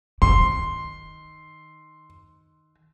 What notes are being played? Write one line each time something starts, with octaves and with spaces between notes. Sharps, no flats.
D#3 C6